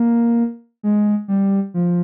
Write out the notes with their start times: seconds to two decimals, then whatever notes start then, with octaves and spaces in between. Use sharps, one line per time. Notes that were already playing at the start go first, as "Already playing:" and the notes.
Already playing: A#3
0.83 G#3
1.28 G3
1.74 F3